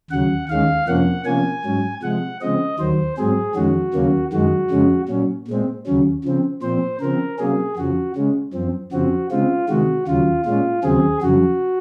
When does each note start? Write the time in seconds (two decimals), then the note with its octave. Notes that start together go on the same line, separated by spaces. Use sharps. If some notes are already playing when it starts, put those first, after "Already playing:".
0.10 D#2 C#3 F#3 F#5
0.49 D#2 D#3 G#3 C#4 F5
0.87 F2 C3 F3 A#3 C#4 F#5
1.25 C3 F3 A#3 C#4 G#5
1.65 G#2 F#3 C#4
2.03 C3 F3 G#3 F#5
2.41 C#3 F3 G#3 C4 D#5
2.79 D#2 D#3 F#3 C5
3.17 G#2 F#3 C4 G#4
3.55 F2 D#3 G#3 C#4 F#4
3.94 D#2 C#3 F#3 A#3 C#4
4.33 F#2 D#3 G#3 F#4
4.71 F2 C#3 G#3 C#4
5.09 A#2 F#3 C#4
5.48 A#2 G#3 C4
5.86 D#2 C#3 F#3 C#4
6.24 C#3 F3 C4
6.62 A#2 F3 C4 C5
7.01 C#3 F3 C4 A#4
7.39 C3 F#3 A#3 C#4 G#4
7.77 F2 C#3 F3 F#4
8.16 C#3 G#3 C#4
8.54 F#2 F3 C4
8.92 F2 C#3 F3 C4 F#4
9.31 C#3 G#3 C4 F4
9.69 C3 D#3 G#3 F#4
10.08 D#2 C#3 F#3 F4
10.45 A#2 G#3 C#4 F4
10.83 D#2 C#3 F#3 C4 G#4
11.22 F2 C#3 F#3 F#4